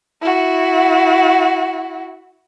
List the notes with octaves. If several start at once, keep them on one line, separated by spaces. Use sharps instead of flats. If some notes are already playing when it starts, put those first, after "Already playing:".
E4 F#4